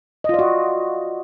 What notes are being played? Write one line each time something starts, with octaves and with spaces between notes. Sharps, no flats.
F4 F#4 D5 D#5